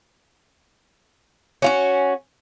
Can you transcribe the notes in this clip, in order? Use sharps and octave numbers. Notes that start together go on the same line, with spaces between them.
C#4 F4 F#4